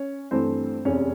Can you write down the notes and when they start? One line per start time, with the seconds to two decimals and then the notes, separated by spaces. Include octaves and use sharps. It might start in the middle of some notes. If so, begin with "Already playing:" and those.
Already playing: C#4 C#5
0.31 G2 E3 A3 C4 C5
0.85 F1 E2 C3 C#4 C#5